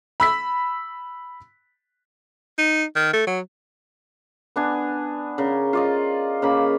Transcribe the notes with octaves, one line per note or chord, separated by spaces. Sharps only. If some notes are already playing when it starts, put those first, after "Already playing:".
B5 E6 B6
D#4
D#3
A3
F#3
B3 D4 G#5
C#3 A#4
F4 D5 D#5
C#3 A#3 B5